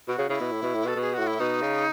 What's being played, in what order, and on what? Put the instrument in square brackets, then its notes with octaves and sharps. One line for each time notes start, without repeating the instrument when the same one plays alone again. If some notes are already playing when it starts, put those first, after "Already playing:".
[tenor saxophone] B2 [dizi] F#4
[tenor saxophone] C#3
[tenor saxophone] C#3 [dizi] E4
[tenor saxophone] B2
A2
B2
A2
B2
[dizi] A4
[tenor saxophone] B2
[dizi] G#4
[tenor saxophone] A2 [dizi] F#4
[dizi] E4
[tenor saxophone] B2 [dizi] D#4
[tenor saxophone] C#3